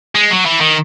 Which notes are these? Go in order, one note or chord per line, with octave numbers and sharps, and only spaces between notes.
G#3
F#3
E3
D#3